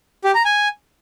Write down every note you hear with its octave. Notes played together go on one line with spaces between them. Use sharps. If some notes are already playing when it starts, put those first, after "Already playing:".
G4
A#5
G#5